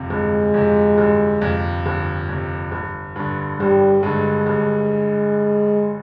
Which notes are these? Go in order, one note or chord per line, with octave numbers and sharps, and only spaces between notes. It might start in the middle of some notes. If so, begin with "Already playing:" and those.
Already playing: G1 F2 C3
G1 G#3
F2 C3
G1
F2 C3
G1
F2 C3
G1
G2 D3
G1 G3
G2 D3 G#3
G1